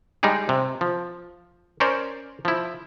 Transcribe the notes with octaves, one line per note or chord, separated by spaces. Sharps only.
G3 G#3 D#4 G4 G#4
C3
F3
C#4 A#4 C5 D5
F3 E4